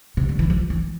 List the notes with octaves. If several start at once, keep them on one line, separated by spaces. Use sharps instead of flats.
C3
D3
E3
F3
E3